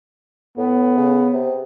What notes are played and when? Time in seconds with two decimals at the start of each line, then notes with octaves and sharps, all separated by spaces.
0.58 A2 B3
0.98 C#3
1.34 C3